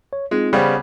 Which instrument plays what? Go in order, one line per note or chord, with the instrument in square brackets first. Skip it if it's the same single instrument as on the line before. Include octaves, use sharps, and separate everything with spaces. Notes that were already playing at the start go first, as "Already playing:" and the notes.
[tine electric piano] C#5
[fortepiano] G#3 [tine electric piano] C4 D#4 F4
[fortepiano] C#3 G3 B3 [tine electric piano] C5 F5 G5